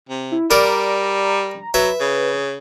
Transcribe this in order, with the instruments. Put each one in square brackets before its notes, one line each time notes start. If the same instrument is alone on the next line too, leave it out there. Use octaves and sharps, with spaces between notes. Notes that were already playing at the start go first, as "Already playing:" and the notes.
[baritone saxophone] C3
[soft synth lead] E4
[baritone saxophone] G3 [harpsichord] A#4 D5 [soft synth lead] A#5
[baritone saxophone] F#3 [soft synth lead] B4 [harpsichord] E5
[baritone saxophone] C#3